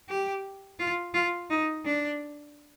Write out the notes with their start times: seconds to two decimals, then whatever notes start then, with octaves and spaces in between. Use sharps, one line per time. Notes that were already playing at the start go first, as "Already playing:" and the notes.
0.09 G4
0.79 F4
1.14 F4
1.50 D#4
1.86 D4